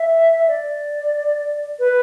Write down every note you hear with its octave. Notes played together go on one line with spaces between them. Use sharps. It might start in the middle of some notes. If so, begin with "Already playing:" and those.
Already playing: E5
D5
B4